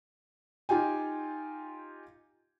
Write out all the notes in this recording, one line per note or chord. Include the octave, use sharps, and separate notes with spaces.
D#4 F4 G4 G5 G#5